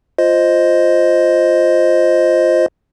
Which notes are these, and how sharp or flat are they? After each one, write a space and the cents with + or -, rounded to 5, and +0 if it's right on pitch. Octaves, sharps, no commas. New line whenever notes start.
F4 +0 C5 +0 D#5 +0